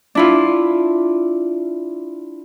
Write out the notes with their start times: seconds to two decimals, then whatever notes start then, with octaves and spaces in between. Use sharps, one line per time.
0.15 D4 E4 F4